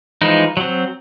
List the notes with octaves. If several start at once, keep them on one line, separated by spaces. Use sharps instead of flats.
E3 F3 G#3 D#4
F#3 C4